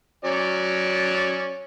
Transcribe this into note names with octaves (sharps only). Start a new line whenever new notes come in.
F#3 C#4 D5